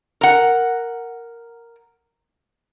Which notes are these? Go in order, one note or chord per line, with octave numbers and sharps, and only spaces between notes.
A#4 F#5